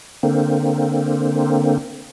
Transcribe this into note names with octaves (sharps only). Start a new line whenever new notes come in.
D3 A#3 C4